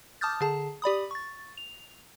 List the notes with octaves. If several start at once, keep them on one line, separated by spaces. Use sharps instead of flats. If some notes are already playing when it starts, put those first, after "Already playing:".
A5 D6 D#6 F6 G6 A6
D3 G#4 A5
G4 D5 B5 D#6
C#6 A6
F7